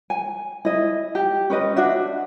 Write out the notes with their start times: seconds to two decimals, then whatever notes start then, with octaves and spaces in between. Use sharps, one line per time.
0.10 G#5
0.65 E4 D#5
1.15 G4
1.50 C#4 B4 D#5
1.76 D4 F#4 E5